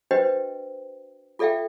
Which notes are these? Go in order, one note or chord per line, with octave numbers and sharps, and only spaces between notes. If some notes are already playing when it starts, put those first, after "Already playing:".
D4 F#4 B4 C5 D#5 G5
F4 A4 D5 E5 F5 G5